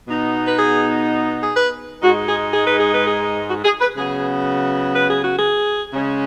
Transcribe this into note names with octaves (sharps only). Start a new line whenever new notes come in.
B2 B3 D#4
B4
G#4
G#4
B4
G#2 G#3 D#4 F#4
G#4
G#4
B4
G#4
B4
G#4
F#4
G#4
B4
C#3 F#3 B3 G#4
B4
G#4
F#4
G#4
C#3 G#3 C#4